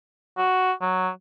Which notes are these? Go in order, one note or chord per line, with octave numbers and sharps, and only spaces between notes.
F#4
F#3